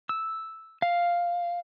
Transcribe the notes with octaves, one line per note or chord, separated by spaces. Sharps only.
E6
F5